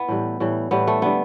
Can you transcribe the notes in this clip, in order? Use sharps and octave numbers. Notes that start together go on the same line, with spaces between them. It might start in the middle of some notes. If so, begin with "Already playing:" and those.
Already playing: B3 E4
A2 E3 G3
A2 E3 G3
A2 E3 G3 B3
A3
D3 G3 B3